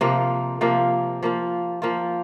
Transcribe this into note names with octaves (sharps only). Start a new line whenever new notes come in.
C3 F3 A#3 F4
C3 F3 A#3 F4
F3 A#3 F4
F3 A#3 F4